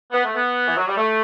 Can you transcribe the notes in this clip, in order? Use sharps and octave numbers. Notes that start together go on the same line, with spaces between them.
B3
A3
B3
E3
F#3
G3
A3